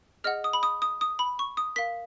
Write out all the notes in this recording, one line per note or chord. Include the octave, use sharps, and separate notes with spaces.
G#4 D#5 F#5 F6
D#6
B5
D#6
D#6
D#6
B5
C#6
D#6
A#4 F5 B6